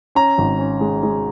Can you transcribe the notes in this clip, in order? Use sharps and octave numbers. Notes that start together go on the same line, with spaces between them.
C#4 A#5
G#1
C#4
G#3
G#3